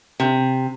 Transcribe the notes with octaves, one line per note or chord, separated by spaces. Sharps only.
C3